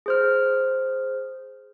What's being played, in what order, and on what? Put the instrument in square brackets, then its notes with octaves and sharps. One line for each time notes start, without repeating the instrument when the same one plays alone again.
[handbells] G#4 C5 F6